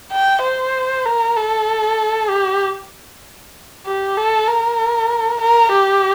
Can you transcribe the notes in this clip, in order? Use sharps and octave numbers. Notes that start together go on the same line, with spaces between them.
G5
C5
A#4
A4
G4
G4
A4
A#4
A#4
G4